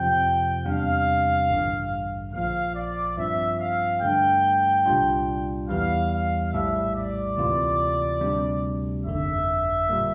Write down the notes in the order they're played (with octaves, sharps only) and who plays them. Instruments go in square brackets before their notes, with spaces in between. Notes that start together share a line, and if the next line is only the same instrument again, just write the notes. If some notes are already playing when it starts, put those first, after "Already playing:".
Already playing: [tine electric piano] F2 C3 F3 [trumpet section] G5
[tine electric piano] E2 C3 G3 D4 [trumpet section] F5
[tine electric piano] A1 G2 D3
[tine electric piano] A#1 A#2 F3 [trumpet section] F5
[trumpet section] D5
[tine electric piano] G2 F3 C4 [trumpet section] E5
[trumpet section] F5
[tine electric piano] G2 D3 A3 [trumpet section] G5
[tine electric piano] C2 A#2 G3 D4 F4
[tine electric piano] E2 E3 G3 [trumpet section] F5
[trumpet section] F5
[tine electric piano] A#1 A2 G3 [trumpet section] E5
[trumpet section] D5
[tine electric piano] D2 C3 E3 A#3 F4
D2 C3 G3 D4
[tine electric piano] G1 F2 D3 [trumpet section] E5
[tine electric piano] A#2 G3 A#3